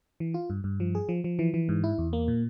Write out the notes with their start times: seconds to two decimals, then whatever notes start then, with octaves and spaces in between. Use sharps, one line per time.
0.20 E3
0.34 F4
0.50 G2
0.64 G2
0.80 F3
0.95 G#4
1.09 F3
1.24 F3
1.39 E3
1.54 E3
1.69 G#2
1.84 E4
1.98 E2
2.13 A#3
2.28 A#2